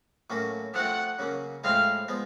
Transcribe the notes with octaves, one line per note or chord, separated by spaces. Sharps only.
A2 F#3 A#3 C#4 F#4
F3 A3 C4 F#5
C#3 F#3 A#3 C#4
A2 F3 G#3 C4 E4 F5
F3 G#3 B3